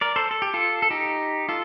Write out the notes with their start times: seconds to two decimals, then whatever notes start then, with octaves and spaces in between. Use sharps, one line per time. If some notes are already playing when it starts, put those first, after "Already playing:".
0.01 A#4 D5
0.16 A4 C5
0.31 A4
0.42 G4
0.54 F4 A4
0.82 A4
0.91 D#4 G4
1.49 F4 A4